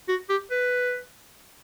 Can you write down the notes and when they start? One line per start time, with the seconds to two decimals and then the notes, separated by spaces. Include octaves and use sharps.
0.08 F#4
0.30 G4
0.51 B4